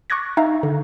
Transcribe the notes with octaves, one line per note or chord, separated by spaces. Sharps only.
C#6 D6 F#6 G#6 A#6
D#4 E5 F5 A#5
D3